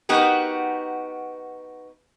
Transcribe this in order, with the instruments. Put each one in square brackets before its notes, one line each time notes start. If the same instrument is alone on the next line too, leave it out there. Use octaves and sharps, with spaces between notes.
[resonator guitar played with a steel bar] B3 D#4 F#4 G4 A#4